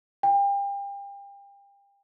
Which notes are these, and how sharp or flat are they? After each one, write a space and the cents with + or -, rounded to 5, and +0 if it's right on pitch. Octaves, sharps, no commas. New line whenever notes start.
G5 +35